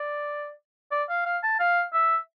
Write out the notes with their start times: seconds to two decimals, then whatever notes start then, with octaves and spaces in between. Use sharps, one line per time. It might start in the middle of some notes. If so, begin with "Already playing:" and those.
Already playing: D5
0.92 D5
1.09 F5
1.26 F5
1.43 A5
1.60 F5
1.93 E5